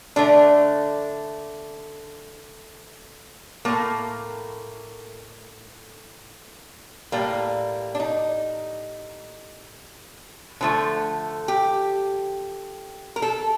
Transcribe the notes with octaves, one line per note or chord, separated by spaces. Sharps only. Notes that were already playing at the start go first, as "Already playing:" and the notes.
D3 A3 D4
A2 A3 A#3
A2 G3 A#3
D4
D#4
D3 F3 A3
G4
A#4
A4